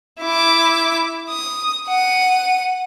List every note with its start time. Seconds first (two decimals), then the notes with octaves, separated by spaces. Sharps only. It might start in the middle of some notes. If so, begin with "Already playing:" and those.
0.21 E4 D6
1.29 D#6
1.88 F#5 D#7